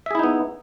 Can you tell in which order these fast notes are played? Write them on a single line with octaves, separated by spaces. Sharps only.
E5 G#4 E4 D#4 B3